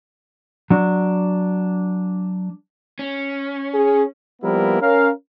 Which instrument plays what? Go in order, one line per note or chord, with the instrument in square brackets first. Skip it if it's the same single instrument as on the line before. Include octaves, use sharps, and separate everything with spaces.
[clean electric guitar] F#3 D4
[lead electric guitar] C#4
[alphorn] G#4
[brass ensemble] F3 G3 A#3 B3 E4 A#4
C#4 A#4 F5